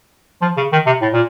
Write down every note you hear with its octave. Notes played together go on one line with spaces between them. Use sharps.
F3
C#3
D#3
C3
A2
A#2